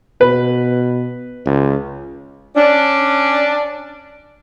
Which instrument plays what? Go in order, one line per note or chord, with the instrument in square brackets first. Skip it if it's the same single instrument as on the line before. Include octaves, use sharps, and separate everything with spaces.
[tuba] B2 [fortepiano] B4
[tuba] C#2
[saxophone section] C#4 D4